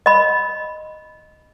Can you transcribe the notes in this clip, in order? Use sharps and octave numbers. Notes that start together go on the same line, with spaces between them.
D#5 B5